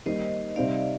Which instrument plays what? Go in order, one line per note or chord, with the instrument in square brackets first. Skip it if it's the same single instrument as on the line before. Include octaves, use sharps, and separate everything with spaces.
[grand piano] D#3 G3 A#3 D#4 [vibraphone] C5 D#5
[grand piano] C3 G3 C4 D#4 [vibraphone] D5 F5